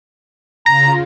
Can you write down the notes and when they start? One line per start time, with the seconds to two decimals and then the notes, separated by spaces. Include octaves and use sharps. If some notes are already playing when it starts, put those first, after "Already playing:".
0.66 C#3 F4 A#5 A#6